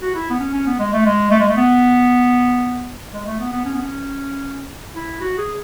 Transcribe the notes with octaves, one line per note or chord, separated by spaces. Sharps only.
F#4
E4
B3
C#4
C#4
B3
G#3
A3
G#3
A3
G#3
A3
B3
G#3
A3
B3
B3
C#4
B3
C#4
E4
F#4
G#4